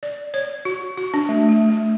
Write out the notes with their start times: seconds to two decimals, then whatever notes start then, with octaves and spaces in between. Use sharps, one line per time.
0.03 D5
0.34 C#5
0.65 F#4
0.98 F#4
1.14 D4
1.29 A3
1.49 A3
1.70 A3